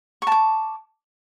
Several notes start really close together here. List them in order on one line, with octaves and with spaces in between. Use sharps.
C#6 A5 D6